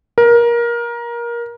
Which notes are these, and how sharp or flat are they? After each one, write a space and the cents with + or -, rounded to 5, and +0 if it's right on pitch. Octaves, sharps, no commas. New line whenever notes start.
A#4 +20